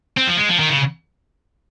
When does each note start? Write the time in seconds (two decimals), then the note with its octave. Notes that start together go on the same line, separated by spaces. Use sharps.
0.17 C4
0.27 F3
0.37 G#3
0.49 F3
0.59 D#3
0.70 C#3